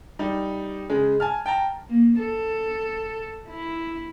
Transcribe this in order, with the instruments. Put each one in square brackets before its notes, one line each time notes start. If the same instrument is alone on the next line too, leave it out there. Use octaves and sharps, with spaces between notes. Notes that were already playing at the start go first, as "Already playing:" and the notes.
[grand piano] G3 D#4
C#3 G#3
G#5 A5 F6
G5 A5 A#5
[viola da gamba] A#3
A4
E4